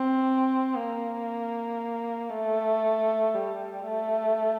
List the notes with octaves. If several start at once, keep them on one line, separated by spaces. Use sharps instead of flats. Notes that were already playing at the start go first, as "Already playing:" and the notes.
Already playing: C4
A#3
A3
G3
A3